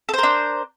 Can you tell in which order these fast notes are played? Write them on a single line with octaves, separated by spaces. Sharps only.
A4 C5 A#4 D4